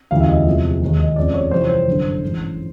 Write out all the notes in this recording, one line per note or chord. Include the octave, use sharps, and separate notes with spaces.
E1 D2 C#3 E3 G3 F5
E5
D#5
E2 C3 F3 G#3
D#2 D#3 G#3
D#5
F1 F2 C#3 F3 G#3 D5
C#5
F2 C3 E3 G3 C5
C#5
C5
G1 F#2 D3
A1 G#2 E3